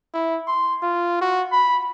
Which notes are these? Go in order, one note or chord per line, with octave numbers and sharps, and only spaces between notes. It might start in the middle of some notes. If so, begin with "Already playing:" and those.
E4
C6
F4
F#4
B5